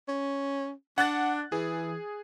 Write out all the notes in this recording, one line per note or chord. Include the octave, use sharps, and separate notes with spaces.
C#4
D4 F#5 F#6 A6
E3 G#4